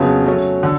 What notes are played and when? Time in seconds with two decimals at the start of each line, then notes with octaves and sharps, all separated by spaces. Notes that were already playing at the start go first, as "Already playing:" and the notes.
Already playing: F2 C#3 F#3 B3
0.26 F#3 A3 C#4
0.63 D3